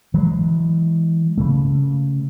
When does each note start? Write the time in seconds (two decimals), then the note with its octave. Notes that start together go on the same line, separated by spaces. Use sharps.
0.14 E3 F#3 G#3
1.37 C#3 A3